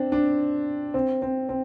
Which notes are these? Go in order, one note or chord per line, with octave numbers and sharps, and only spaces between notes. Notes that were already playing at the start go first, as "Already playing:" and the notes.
Already playing: C4 D4
D4
C4
C4
C4